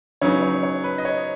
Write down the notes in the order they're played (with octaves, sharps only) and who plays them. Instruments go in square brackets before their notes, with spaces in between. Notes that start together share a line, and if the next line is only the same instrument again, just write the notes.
[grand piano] C#3 F#3 B3 D#4 C#5
C#5
C#5
B4
D#5
C#5